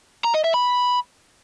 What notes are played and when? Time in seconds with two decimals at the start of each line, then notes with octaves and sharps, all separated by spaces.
0.24 A#5
0.34 D#5
0.44 E5
0.54 B5